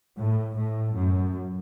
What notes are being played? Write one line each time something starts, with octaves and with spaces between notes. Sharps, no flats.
A2
A2
F#2